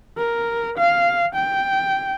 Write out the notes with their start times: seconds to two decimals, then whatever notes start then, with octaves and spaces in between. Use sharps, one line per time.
0.18 A#4
0.78 F5
1.35 G5